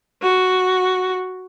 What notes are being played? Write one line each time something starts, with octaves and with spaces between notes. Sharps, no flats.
F#4